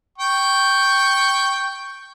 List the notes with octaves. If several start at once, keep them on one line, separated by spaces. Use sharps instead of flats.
G5 C#6